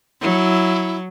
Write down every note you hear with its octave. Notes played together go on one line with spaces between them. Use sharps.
F#3 E4